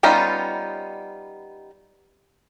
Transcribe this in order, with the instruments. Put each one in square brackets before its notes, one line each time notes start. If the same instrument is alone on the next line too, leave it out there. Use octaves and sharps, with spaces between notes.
[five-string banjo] G3 B3 C#4 D#4 F4